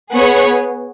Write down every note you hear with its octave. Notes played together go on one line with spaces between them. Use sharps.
B3 G#4 C#5 F#5